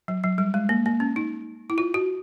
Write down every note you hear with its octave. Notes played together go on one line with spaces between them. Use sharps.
F#3
F#3
G3
G#3
A#3
A#3
C#4
D#4
E4
F4
F#4